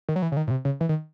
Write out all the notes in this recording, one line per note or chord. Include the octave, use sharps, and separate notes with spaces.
D#3
F#3
E3
C#3
D#3
A2
C3
C#3
E3
D#3